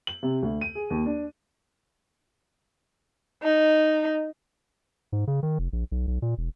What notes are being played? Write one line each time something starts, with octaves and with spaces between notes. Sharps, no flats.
F#7
C3
D2
D#7
G#4
D#2
D4
D#4
G#2
C#3
D#3
F1
A#1
B1
B1
A#2
E1